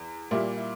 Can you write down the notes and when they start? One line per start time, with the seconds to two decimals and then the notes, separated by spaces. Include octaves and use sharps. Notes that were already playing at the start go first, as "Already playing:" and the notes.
Already playing: E2
0.31 A#2 G3 A#3 E4
0.57 E4